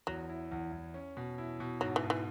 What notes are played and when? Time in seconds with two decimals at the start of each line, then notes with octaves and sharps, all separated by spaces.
0.07 E2 F#3
0.29 E4
0.52 E2
0.72 E2
0.94 C#4
1.17 B2
1.38 E4
1.60 B2
1.81 G#2 F#3
1.96 E3
2.03 G#2
2.10 E3